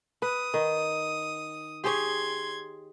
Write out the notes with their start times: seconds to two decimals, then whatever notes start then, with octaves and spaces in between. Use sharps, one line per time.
0.22 B4 D#6
0.54 D#3
1.84 G4 G#4 C#5 C6 G#6